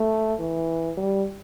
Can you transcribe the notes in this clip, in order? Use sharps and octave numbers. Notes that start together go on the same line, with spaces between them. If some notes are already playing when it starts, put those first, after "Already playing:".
Already playing: A3
E3
G3